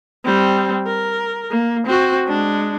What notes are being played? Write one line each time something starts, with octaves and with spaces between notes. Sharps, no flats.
G3 C4
A#4
A#3
C4 F#4
G#3 D4